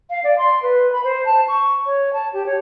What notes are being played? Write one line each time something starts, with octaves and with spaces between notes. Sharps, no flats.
F5
D5
C6
B4
B5
C5
A5
C#6
C#5
A5
G4
C#5